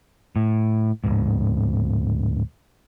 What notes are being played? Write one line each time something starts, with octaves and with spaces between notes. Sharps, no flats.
A2
D1 G#2